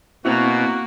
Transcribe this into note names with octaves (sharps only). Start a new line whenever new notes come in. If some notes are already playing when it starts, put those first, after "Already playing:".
B2 A#3 C4 E4 F#4